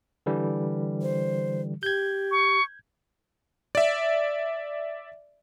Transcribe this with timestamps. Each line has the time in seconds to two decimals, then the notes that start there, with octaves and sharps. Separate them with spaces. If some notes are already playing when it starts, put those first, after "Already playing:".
0.26 D3 E3 G3
1.02 C5
1.83 G4 G6 G#6
2.31 C#6
3.75 D5 E5